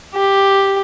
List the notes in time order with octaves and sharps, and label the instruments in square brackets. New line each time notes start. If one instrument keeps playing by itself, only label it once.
[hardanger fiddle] G4